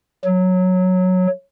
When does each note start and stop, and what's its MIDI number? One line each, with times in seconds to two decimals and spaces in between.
0.25 1.26 54